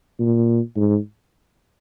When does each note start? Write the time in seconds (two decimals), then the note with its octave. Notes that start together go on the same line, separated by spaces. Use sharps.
0.19 A#2
0.76 G#2